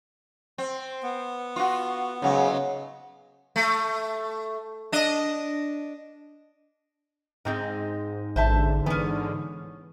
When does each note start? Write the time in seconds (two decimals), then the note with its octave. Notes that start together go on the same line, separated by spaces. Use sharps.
0.58 C4
1.03 B3
1.56 F4 F#4
2.22 G#2 C#3 F#3
3.56 A3
4.92 D4 D#5
7.45 G#2 G#3 C4 D#4
8.36 A1 D3 C5 E5 A5
8.86 E3 B3 C#4